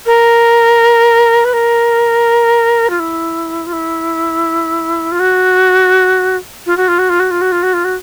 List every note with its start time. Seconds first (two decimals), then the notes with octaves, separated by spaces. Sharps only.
0.06 A#4
1.44 B4
1.53 A#4
2.89 F4
2.99 E4
3.66 F4
3.72 E4
5.11 F4
5.19 F#4
6.66 F4
6.77 F#4
6.88 F4
6.98 F#4
7.09 F4
7.19 F#4
7.30 F4
7.41 F#4
7.51 F4
7.62 F#4
7.73 F4
7.84 F#4